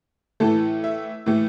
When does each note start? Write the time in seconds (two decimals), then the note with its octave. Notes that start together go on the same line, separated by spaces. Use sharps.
0.40 A2 E3 A3 A4 A5
0.84 E5
1.26 A2 E3 A3